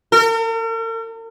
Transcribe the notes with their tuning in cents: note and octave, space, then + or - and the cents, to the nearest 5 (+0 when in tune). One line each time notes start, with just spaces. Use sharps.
A#4 -45